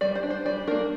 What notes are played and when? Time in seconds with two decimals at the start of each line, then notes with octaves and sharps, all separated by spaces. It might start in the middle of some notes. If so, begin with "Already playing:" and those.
0.01 G3 D5
0.15 C5
0.23 D4
0.30 C5
0.46 G3 D5
0.67 A#3 D4 A#4